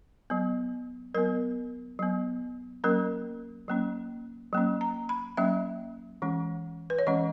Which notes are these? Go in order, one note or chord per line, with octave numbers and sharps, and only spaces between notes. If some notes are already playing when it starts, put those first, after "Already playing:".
F#3 B3
F#3 B3 A#4
F#3 B3
F#3 A#3 C#4 A#4
F#3 A#3 C#4
F#3 A#3 C#4
A#5
B5
F#3 A#3 C#4 E5
E3 G#3 C#4
B4
C#5
E3 G#3 C#4 D#5